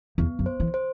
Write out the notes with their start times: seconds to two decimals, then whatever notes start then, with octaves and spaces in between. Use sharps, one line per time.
0.18 E2 B3
0.39 F#2
0.46 C5
0.60 E3
0.74 C5